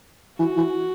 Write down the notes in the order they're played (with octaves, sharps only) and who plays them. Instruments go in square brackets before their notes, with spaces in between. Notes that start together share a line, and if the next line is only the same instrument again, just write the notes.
[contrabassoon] E3 [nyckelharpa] F#4
[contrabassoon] E3